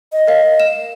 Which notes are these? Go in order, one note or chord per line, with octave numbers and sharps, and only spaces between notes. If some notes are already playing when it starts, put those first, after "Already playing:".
D#5
A#4 F5
E7